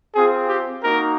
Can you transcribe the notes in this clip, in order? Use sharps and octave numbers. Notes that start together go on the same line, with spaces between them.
C4 F4 G#4
G4
A#3 D#4 F#4 A#4